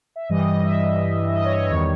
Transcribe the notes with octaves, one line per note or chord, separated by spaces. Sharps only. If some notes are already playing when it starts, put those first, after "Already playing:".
E5
G2 E3 G3 D#5
D#5
E5
D#5
C#5
D#5
C#5
E2 D#3 G3